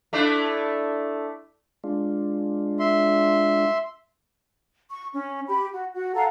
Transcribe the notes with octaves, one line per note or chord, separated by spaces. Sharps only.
A3 D4 E4
G#3 D4 F4
E5 C6
C#6
C#4
G4 B5
F#4
F#4
A4 F5 F#5 A#5